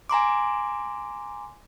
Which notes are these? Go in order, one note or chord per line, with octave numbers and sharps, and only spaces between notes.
G#5 A#5 C6 D6